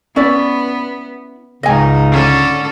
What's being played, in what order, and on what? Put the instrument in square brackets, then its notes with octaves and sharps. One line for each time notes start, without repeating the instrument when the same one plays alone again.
[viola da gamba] B3 [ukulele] C#4 E4 D5
[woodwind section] C#2 C#3 [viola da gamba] G#2 D#4 [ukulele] D#5 G#5
[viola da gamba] D3 C#4 A4